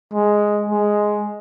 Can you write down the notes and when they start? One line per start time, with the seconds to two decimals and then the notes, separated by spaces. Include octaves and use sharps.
0.13 G#3
0.69 G#3